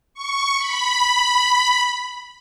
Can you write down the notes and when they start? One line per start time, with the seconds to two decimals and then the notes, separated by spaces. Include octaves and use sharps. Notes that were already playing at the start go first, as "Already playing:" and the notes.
0.14 C#6
0.58 B5